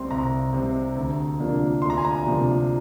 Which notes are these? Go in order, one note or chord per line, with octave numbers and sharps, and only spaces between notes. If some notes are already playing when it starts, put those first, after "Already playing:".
Already playing: C2 C3 G3 C4 C6
C2 A#5
C3 G3 C4
D2
C3 F3 A#3 D4
D2 C6
A#5
G#5
A#5
C3 F3 A#3 D4